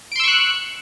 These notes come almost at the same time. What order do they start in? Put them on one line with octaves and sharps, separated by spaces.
D7 C6 E6 C#6 F#6